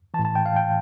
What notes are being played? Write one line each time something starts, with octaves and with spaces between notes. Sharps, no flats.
E3 A5
A2
A5
G5
F5
G5